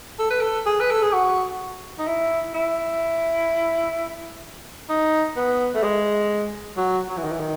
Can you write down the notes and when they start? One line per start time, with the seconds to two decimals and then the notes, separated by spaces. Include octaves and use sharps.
0.19 A4
0.30 B4
0.41 A4
0.66 G#4
0.80 B4
0.91 A4
1.02 G#4
1.13 F#4
1.99 D#4
2.07 E4
2.54 E4
4.89 D#4
5.36 B3
5.74 A3
5.83 G#3
6.77 F#3
7.08 F#3
7.17 E3
7.24 D#3
7.32 E3
7.40 D#3